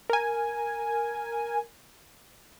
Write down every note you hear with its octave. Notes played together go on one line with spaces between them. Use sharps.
A#4 G#5